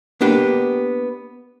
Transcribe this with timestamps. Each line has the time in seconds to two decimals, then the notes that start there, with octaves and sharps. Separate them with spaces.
0.21 A#3 B3 D4 G4